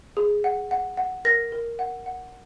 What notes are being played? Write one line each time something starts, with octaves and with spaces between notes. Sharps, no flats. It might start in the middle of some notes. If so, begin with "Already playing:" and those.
G#4
F#5
F#5
F#5
A#4 A#6
A#4
F#5
F#5